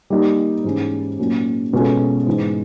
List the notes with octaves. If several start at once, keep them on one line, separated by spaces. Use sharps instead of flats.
G3 A#3 D#4 G4
G#2 E3 G#3 C#4
A#2 F#3 A#3 C#4
B2 G#3 C#4 F4 A4
G#2 E3 G#3